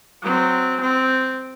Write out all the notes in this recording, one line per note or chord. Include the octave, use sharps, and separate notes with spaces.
F#3 C4
C4